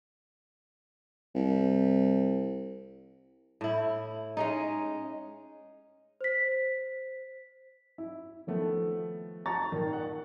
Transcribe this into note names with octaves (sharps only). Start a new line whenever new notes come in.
C2
A2 E4
G#3 C#4 D#4
C5 B6
E4
D#3 F3 A3 B3
A5 A#5 C#6 A6
A#2 D#3
F#5